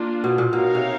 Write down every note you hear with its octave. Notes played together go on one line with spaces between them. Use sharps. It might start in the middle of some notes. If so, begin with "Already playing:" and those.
Already playing: A#3 D4 F4
B2
A#2
B2 D#4 F#4 A#4 C#5 F5
C3